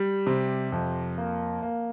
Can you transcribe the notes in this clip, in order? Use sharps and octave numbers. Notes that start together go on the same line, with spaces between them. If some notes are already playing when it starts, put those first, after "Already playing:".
Already playing: G3
C3
F2
A#3
A#3